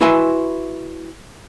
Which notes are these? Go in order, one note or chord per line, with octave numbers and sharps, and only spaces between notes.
E4 F#4 B4 E5 G#5 C6